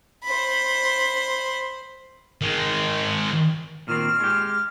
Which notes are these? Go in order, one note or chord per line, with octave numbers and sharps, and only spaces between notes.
C5 B5
D#3 G#3
A#2 D#3 C4 F6
G#3 G4